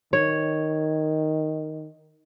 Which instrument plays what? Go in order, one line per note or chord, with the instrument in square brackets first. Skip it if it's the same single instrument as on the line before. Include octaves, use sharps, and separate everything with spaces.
[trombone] D#3 [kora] C#5